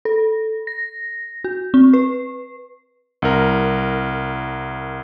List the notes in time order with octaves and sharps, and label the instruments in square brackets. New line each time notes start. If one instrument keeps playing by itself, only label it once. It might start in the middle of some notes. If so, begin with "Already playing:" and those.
[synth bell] A4
A#6
F#4
C4
B4
[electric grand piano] C2 A#4